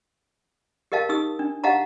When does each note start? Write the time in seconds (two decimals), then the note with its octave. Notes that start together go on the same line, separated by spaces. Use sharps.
0.92 G4 A#4 D#5 F5 A5
1.09 D#4 G4 D#6 E6
1.39 D4
1.64 G4 D#5 F5 F#5 A5 A#5